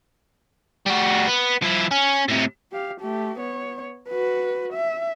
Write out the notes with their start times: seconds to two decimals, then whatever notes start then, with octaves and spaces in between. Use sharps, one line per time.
0.86 G3 F#4
1.28 B3
1.62 F3 E4
1.91 C#4
2.29 A2 C3
2.72 G4 F5
3.01 A3 G4
3.39 B3 C#5
4.09 F#4 B4
4.73 E5